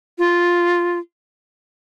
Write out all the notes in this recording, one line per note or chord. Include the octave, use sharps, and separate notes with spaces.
F4